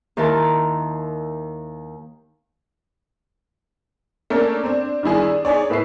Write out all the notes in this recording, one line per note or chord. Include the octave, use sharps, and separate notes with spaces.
D#2 D#3 E4 A#4 A5 C6
A3 A#3 C#4 D4 A4 A#4
C4 D4
D#3 G3 E4 G#4
D4
D#4 G#4 C#5 D5
A2 B4 E5 E6 C7